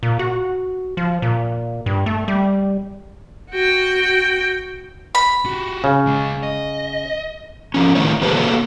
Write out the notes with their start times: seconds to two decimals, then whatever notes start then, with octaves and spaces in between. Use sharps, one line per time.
0.03 A#2
0.19 F#4
0.97 F3
1.22 A#2
1.86 G2
2.06 A3
2.28 G3
3.51 F#4 G5
5.15 B5
5.46 F#4 G4
5.84 C#3
6.07 G#3 C#4
6.43 D#5
7.74 F3 C#4
7.95 D#3 A3 E4 C#5
8.21 E3 G4 A4 B4 C5
8.36 A#3 F#4 A4 C#5